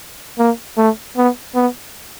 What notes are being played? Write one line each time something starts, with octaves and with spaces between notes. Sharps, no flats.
A#3
A3
B3
B3